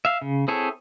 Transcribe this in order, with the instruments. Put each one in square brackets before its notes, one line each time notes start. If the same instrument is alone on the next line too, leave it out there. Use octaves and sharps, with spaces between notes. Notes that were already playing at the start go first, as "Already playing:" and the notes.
[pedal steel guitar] E5 F5
C#3
C4 E4 G#4 A4 C#5